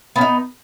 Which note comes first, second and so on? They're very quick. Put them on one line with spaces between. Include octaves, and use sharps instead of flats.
B3 C#4 D#4